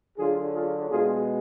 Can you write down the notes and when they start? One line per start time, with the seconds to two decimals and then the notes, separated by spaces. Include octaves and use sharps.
0.18 D3 F#3 F4 G#4
0.53 F4 G#4
0.89 B2 G#3 F4 G#4